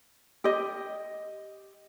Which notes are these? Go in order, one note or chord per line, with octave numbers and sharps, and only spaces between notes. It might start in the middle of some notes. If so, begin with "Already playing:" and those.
G4 D#5